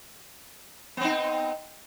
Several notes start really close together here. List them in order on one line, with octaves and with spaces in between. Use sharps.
B3 C4 D#4